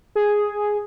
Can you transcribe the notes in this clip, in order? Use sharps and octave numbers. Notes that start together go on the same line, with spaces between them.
G#4